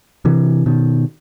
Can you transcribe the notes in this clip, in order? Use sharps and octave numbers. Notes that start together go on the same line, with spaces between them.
C3 E3
B2 D#3